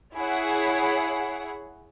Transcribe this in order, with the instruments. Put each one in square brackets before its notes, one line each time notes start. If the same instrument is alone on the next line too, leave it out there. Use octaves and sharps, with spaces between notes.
[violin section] E4 G#4 C#5 F#5